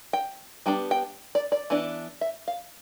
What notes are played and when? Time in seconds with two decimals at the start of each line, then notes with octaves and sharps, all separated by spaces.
0.13 G5
0.66 G3 B3 D4 G5
0.91 G5
1.35 D5
1.52 D5
1.70 E3 B3 D4
2.21 E5
2.48 F5